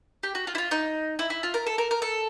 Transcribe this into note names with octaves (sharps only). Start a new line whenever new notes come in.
G4
F#4
F4
E4
F4
D#4
E4
E4
F4
A#4
A4
A#4
A#4
A4